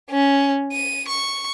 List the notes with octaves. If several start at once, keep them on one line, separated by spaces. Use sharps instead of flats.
C#4
D#7
C#6